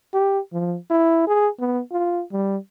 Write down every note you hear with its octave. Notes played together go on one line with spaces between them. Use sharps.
G4
F3
E4
G#4
B3
F4
G3